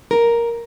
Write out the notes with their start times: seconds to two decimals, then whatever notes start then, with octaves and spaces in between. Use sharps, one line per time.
0.11 A#4